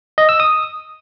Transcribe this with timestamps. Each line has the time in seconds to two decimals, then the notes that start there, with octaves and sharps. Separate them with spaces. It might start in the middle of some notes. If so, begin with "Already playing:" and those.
0.18 D#5
0.29 E6
0.40 D#6